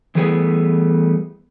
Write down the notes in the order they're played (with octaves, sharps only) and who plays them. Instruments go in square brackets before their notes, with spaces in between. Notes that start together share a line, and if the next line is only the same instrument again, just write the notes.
[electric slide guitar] E3 G3 A3 B3 G#4 B4